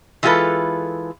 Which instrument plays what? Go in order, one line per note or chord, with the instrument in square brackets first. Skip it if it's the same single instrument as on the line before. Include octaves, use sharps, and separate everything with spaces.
[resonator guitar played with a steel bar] E3 G#3 F4 G4 A4 B4